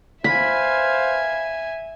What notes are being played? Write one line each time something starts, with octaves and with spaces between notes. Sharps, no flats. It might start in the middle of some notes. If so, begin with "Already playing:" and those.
B4 C5 E5 F5 G#5 B5